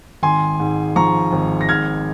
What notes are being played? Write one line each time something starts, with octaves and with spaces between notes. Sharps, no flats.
G#1 G#5 C6
G#2
F3 A#5 C#6
G#1
A#6
G#2 F6 G#6